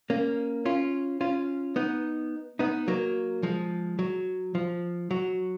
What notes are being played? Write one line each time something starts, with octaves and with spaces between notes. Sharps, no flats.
A#3 C#4
C#4 F4
C#4 F4
B3 D#4
B3 D#4
F#3 A#3
F3 G#3
F#3
F3
F#3